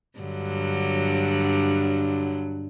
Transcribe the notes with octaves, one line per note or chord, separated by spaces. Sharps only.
G2 D3 F#3